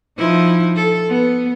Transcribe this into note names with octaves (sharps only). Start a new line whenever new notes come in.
F3 D#4 E4
A4
B3